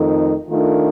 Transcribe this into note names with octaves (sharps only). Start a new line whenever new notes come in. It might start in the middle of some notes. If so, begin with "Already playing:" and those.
Already playing: F2 D#3 A3 D#4 A#4
D#3 A3 D4 F4 A#4